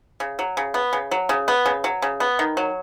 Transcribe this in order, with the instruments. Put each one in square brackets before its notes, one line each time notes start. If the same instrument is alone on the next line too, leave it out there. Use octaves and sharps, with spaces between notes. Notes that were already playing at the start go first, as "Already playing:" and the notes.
[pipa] C#3
F#3
C#3
B3
C#3
F#3
C#3
B3
C#3
F#3
C#3
B3
D#3
F#3